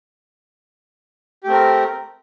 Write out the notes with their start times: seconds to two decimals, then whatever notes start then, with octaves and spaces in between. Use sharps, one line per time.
1.44 G4
1.46 A3
1.49 C4
1.52 A#4